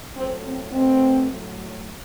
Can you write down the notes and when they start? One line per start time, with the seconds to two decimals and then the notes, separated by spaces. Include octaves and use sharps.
0.15 A2 F#3 A3 C4
0.43 C4
0.71 B2 A3 C4
1.28 A2 F#3 A3